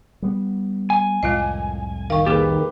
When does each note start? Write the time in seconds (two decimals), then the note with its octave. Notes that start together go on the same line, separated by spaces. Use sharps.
0.22 G3 B3
0.90 G#5
1.23 C2 F2 A2 G#3 F4 D#5
2.10 D#3 F5 C#6
2.26 A#3 G4 G#4 B4